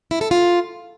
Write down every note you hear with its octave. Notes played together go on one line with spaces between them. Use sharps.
E4
A4
F4